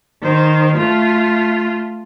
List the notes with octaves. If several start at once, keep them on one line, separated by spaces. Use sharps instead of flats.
D#3 C5
A3 F4